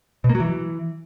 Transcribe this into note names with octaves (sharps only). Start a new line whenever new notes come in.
B2
A#3
F#3
E3